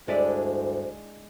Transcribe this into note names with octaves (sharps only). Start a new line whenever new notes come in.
D2 G2 G#3 D4 E4 C5 D5 E5